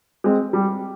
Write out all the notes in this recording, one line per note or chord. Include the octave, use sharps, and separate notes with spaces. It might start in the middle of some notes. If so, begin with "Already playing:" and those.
G#3 C4
G3